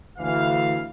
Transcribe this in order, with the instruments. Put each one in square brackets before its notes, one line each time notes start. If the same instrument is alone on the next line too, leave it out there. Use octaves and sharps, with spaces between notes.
[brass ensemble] D2 E3 F5